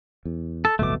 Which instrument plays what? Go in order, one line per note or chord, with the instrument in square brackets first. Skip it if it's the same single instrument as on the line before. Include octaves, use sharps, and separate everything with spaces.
[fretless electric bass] E2
[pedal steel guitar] A4
[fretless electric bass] D1 G1 B2 [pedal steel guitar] A3 D6